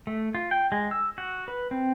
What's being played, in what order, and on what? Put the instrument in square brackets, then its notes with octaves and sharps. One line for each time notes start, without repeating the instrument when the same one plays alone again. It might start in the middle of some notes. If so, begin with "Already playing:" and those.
[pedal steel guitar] A3
F4
G5
G#3
E6
F#4
B4
C4